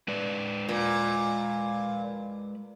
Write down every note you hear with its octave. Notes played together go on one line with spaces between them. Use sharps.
G#3 B4 D5
A#2